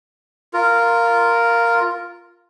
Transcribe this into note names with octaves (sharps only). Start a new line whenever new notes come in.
F4 A#4